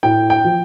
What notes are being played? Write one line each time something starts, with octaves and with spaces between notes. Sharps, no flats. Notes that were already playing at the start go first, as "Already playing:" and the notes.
A2 G5
G5
F3